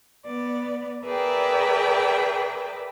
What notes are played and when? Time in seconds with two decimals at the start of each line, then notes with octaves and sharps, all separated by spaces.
0.26 B3 D5
1.06 G#4 A#4 B4 D5 E5 G5